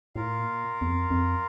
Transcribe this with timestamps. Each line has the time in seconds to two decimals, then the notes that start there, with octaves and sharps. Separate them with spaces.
0.15 A2 F4 A#4 F5
0.39 A#2
0.81 E2
0.87 F2
1.11 F2